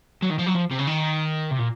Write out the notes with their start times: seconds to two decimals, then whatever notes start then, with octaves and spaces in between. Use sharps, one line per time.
0.23 F#3
0.30 D#3
0.39 F3
0.47 F#3
0.55 F3
0.71 C3
0.78 C#3
0.87 D#3
1.51 C3
1.59 A#2